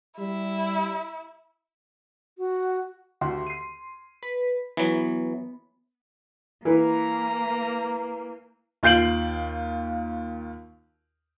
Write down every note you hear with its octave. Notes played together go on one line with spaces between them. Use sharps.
G3 E4
F#4
D2 F#4 G4 C6
C7 D#7
B4
E3 F#3 B3
E3 A#3 B4 A#5
D#2 F4 G6 C7 D7 F#7